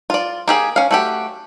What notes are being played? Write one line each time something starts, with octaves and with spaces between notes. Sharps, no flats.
F4 D5
A#3 G4 G#4
C#4 F5
A3 F#4 G4